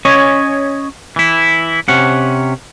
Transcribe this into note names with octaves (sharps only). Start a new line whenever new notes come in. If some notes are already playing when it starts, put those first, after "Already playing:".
C#4 C#5 D#5 G#5
E3 E4
C3 C#4 F#5